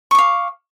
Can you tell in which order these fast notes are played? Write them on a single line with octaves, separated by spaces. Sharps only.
C#6 D6 F5